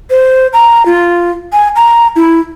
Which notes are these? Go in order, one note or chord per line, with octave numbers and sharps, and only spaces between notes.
C5
A#5
F4
G#5
A#5
E4